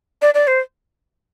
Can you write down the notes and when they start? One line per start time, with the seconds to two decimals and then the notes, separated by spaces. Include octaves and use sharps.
0.22 D5
0.34 D5
0.47 C5